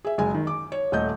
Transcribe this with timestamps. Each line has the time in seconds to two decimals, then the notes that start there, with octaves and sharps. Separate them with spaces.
0.05 G#4 E5
0.18 F#1 G#3 G#5
0.34 D#3
0.47 D6
0.72 C#5
0.92 D#1 A3 D#5 G6